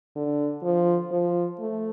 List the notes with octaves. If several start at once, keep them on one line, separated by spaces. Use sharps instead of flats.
D3
F3
F3
A3